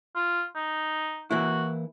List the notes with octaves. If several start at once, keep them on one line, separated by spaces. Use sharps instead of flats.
F4
D#4
E3 A#3 E4 F#4